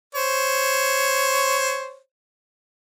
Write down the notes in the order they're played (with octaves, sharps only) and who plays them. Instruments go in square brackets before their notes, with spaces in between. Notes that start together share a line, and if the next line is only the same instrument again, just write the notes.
[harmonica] C5 C#5